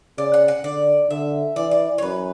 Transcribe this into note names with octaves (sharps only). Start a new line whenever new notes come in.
C#3 D5
F#5
F#5
D3 D5
D3 E5
E3 D5
D5
C#5
F#2 B4